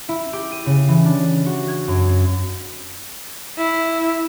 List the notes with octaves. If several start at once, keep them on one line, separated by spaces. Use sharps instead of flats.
E4
G4
D#7
C#3
E3
D4
F#4
G#6
F#2
E4